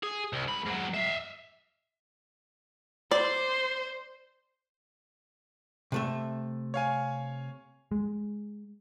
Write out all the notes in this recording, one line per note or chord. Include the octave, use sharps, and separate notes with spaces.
G#4
C2
C#2 B5
G#2 F#3
E5 F5
C5 D5
C3 A3 E5
C#5 F5 G#5
G#3